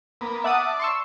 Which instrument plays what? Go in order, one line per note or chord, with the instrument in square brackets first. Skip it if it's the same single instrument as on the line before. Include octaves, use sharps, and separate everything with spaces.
[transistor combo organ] A#3 B3
[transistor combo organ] D5 A5 [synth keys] E5 F#5 D#6
[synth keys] C6 C#6 E6